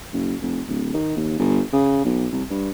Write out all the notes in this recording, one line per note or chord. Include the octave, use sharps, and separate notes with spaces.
F#1
F1
D1
D#3
D#2
G1
C#3
B1
C2
G2